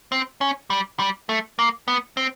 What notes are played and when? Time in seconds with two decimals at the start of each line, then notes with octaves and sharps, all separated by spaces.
0.12 C4
0.41 C#4
0.70 G3
0.99 G3
1.29 A3
1.59 A#3
1.88 B3
2.17 C4